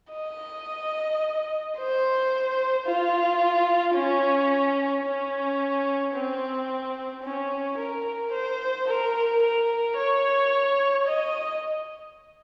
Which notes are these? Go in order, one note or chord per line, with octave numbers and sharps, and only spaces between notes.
D#5
C5
F4
C#4
C#4
C4
C#4
A#4
C5
A#4
A#4
C#5
D#5